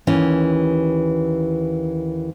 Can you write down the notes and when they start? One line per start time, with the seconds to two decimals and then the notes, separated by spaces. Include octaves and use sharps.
0.07 D#2 E3 C#4